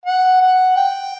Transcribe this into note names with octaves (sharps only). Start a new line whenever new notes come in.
F#5
F#5
G5